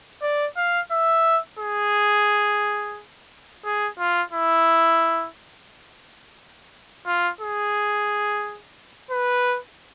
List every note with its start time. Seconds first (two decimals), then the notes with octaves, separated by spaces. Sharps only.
0.23 D5
0.57 F5
0.92 E5
1.59 G#4
3.65 G#4
3.99 F4
4.32 E4
7.06 F4
7.41 G#4
9.11 B4